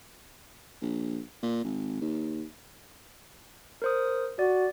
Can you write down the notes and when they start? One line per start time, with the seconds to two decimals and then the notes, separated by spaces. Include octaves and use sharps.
0.82 A#1
1.43 A#2
1.64 G#1
2.01 D#2
3.82 A#4 C5 D#6
4.39 F#4 D5